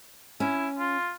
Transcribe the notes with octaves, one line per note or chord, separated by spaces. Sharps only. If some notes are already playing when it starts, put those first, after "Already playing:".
C#4 E4
F4